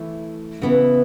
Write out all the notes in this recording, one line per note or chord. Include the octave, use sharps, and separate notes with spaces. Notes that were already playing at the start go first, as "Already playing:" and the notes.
Already playing: E3 A3 E4
C#3 E3 B3 E4